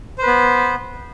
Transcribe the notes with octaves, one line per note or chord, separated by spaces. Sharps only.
B3 B4 C5